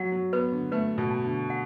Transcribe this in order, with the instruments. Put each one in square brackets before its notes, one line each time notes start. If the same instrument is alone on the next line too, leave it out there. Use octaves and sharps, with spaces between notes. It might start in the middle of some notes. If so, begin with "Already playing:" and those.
Already playing: [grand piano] F#3 [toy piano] F#5
[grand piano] F#3
[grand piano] B3 [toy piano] B4
[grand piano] D3
[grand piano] A3 [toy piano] B4
[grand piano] B2
[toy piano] A5
[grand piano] D3
[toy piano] F#5